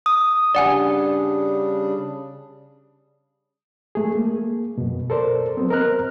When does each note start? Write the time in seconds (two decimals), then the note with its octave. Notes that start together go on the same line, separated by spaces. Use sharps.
0.06 D#6
0.55 C#3 G3 D4 D5 F#5 G#5
3.95 G#3 A3 G#4
4.15 A#3
4.78 F#2 B2
5.10 A4 A#4 C5 D5
5.57 F#3 B3 C4
5.71 A#4 C5 D#5 A#5 F6 F#6